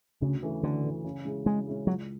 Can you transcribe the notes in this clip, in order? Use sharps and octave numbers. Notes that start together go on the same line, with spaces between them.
D2 C#3
C#3 E3 A3
D2 D3
C#3 E3 A3
C#3
G#3 C#4 E4 G#4
C#3 G#3
G#3 C#4 E4 G#4
C#2 F#3